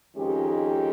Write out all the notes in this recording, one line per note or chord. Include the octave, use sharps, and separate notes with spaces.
F2 D#3 G#3 C#4 G4